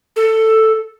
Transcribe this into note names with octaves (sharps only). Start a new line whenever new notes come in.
A4